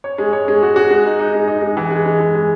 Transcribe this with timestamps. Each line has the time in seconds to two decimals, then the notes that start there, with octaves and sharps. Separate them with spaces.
0.04 C#5
0.18 G#3
0.33 C#5
0.48 G#3
0.63 F#4
0.76 F#4
0.91 G#3
1.05 D#4
1.19 D#4
1.34 G#3
1.48 D#4
1.62 G#3
1.77 E3
1.91 G#3
2.06 G#3
2.19 E3
2.35 G#3